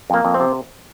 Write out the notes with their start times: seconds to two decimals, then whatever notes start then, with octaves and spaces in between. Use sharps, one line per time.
0.10 F2 A#3
0.25 F2
0.34 C4
0.40 C3